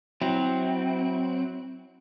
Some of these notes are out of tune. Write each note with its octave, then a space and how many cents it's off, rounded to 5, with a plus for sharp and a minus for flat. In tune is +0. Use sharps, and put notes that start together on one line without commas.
F#3 +0 C4 +0 E4 -25